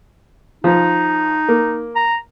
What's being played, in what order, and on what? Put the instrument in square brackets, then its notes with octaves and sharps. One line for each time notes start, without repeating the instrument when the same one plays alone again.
[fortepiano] F3 [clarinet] D#4
[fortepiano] A#3
[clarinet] A#5